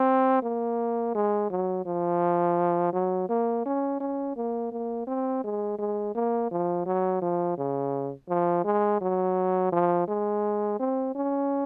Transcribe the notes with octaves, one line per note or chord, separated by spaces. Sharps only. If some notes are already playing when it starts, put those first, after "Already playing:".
Already playing: C4
A#3
G#3
F#3
F3
F#3
A#3
C#4
C#4
A#3
A#3
C4
G#3
G#3
A#3
F3
F#3
F3
C#3
F3
G#3
F#3
F3
G#3
C4
C#4